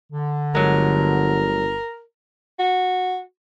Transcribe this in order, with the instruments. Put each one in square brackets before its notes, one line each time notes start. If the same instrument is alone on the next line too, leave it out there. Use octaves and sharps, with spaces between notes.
[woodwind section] D3
[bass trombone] G1 [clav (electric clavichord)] F#3 G#3 [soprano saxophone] A#4
[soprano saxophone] F#4